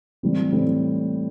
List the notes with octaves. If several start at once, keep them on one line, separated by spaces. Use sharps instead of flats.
A2 E3 G3 C4
A2 E3 G3 C4